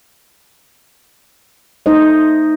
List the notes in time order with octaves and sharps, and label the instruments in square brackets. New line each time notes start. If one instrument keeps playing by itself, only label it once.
[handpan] A3 D#4 C5 D#5